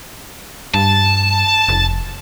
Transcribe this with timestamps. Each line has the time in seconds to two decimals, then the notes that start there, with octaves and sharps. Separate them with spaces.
0.74 G2 A5
1.69 F1